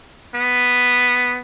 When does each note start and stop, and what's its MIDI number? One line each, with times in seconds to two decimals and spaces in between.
0.35 1.41 59